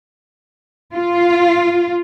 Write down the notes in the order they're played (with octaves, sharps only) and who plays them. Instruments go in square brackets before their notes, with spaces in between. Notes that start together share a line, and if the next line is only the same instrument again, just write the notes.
[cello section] F4